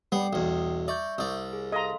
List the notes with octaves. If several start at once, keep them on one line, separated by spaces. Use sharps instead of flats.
G3 B3 G5 C7
B1 E2
D5 E5 C#6 G6
C2 D5
G#4
A4 D#5 F5 A#5 C6